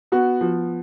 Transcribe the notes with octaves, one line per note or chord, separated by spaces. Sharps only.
B3 F#4
F3